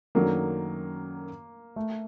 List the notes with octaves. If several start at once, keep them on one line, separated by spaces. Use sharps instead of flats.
F#2 D#3 F#3 A3 A#3 D4
A3